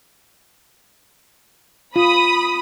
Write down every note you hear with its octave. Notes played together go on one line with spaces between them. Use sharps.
F4 B5 D#6